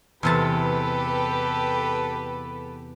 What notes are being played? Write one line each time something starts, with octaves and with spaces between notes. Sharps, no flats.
E2 C3 G4 A4 B4 A5